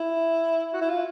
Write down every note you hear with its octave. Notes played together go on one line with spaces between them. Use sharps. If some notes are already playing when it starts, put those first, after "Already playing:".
Already playing: E4
F#4
E4
F4